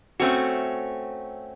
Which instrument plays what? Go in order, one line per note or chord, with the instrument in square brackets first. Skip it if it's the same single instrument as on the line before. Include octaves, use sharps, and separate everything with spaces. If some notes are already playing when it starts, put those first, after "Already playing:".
[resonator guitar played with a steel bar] A3 C4 C#4 F#4